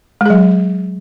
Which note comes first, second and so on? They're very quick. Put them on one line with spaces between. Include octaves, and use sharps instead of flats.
G#3 G#4 F#3